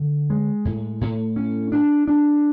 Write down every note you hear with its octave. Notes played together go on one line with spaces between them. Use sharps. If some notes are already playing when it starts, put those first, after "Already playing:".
Already playing: D3
G#3
A2
A2
C#4
D4
D4